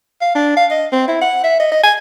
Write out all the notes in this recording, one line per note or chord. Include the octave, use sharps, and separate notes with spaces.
F5
D4
F5
D#5
C4
E4
F#5
E5
D#5
D#5
G#5